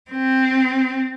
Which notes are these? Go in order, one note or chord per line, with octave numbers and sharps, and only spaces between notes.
C4